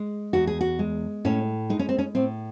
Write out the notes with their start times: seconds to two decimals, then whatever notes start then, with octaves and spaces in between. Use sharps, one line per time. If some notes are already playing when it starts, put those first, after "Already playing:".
Already playing: G#3
0.33 E2 F#4
0.47 G#4
0.61 F#4
0.79 G#3
1.25 A2 C#4
1.70 G#3 D#4
1.79 C#4
1.89 C4
1.98 C#4
2.15 A2 C4